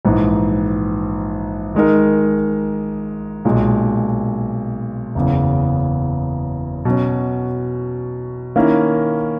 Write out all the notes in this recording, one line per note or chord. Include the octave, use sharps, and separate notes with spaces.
A#1 G#2 E3
D#3 G#3 D#4 A#4
B1 A#2 G#3
F#1 E2 C#3
B2 F#3 C#4
D#3 A#3 C#4 E4 A#4